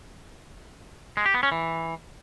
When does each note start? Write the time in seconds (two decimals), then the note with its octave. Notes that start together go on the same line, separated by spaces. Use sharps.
1.17 G#3
1.26 G4
1.34 B3
1.43 C#4
1.52 E3